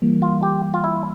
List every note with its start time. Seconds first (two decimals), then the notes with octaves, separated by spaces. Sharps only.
0.02 E3 G3 A#3
0.22 F4
0.43 G4
0.74 F4
0.84 E4